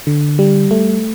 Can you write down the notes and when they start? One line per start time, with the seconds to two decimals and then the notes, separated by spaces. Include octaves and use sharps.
0.07 D3
0.39 G3
0.71 A3